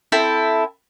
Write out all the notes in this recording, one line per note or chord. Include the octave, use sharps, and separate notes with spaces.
C4 E4 A4